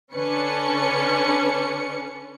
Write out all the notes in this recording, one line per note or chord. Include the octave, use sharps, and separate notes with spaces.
D3 C#4 D4 B4 C#7